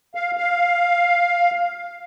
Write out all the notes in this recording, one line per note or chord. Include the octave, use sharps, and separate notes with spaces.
F5
F5